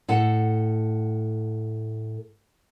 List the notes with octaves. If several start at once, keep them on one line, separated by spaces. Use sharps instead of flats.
A2 A4 F#5